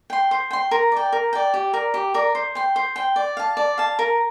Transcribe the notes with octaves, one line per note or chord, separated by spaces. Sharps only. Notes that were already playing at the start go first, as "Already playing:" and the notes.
G5 C6
C5
G5 C6
A#4
D5 G5
A#4
D5 G5
G4
A#4 D5
G4
A#4 D5
C5
G5 C6
C5
G5 C6
D5
F5 A5
D5
F5 A5
A#4